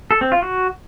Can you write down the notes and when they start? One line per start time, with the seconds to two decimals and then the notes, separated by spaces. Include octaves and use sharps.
0.11 A4
0.21 C4
0.32 F4
0.42 F#4